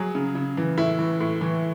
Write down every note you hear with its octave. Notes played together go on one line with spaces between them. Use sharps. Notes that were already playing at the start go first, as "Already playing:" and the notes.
Already playing: F#3 G#4
C#3
C#3
E3
A2 E4
E3
A2
E3